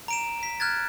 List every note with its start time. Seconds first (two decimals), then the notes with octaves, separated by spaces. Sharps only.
0.08 A#5 D7 E7
0.43 B6
0.60 F6 F#6 G#6 A6